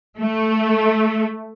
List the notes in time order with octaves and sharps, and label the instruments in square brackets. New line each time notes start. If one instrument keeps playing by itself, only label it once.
[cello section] A3